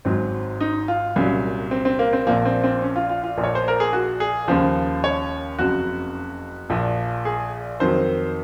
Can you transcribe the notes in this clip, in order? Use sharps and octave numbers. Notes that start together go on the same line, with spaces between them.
G#1 G#2 F#3 C4
D#4
F4
C2 A#2 F#3 C#4
C4
C4
A#3
C4
A#1 A#2 F3 A#3
C4
C4
C#4
F4
F4
F4
A#1 A#2 F3
C#5
C5
A#4
G#4
F#4
G#4
D#2 C#3 F3 C5
C#5
F#1 F2 C#3 F#4
A#1 A#2 F3
G#4
F2 D#3 F#3 C5